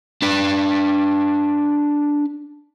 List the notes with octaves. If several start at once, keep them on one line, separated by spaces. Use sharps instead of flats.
D4 B4